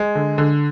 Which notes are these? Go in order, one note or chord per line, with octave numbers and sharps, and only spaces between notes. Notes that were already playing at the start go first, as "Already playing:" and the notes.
Already playing: G#3
D3
D3